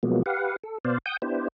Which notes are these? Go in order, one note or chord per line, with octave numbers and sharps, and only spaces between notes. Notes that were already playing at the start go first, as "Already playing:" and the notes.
B2 F3 F#3 G#3 A#3 B3
G4 B4 F5 F#5
A4
B2 B3 C5 D5 F5
F#5 G5 D#6 G6
B3 D4 E4 G4 C5